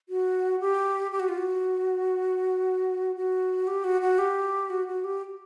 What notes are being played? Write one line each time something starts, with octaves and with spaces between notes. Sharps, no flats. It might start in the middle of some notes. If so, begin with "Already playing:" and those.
F#4
G4
G4
F#4
F4
F#4
F#4
G4
F#4
F#4
G4
F#4
F#4
G4